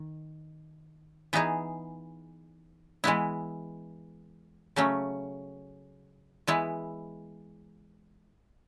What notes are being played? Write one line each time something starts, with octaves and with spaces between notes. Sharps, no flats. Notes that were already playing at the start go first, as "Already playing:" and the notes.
Already playing: D#3
E3 B3 D#4 G#4
E3 G#3 B3 E4
C#3 F#3 A3 C#4
E3 G#3 B3 E4